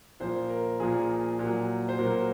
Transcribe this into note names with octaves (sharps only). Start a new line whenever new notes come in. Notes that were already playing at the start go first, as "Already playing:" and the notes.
A#2 F3 C5
A#4
A#2 F3 G#4
A#2 F#3
C5
A#2 F#3 A#4